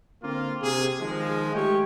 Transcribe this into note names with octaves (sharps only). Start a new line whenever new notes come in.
D3 A#3 C4 F4
C3 G#4
D#3 F3 G#3
G#3 A3 G4 C#5 G5